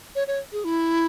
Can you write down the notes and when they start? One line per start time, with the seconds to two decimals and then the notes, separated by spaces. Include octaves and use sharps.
0.15 C#5
0.28 C#5
0.52 G#4
0.64 E4